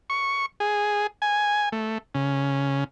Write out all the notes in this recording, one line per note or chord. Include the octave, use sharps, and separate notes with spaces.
C#6
G#4
G#5
A3
C#3